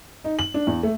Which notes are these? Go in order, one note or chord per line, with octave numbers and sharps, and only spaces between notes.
D#4
F#7
D4
E2
A3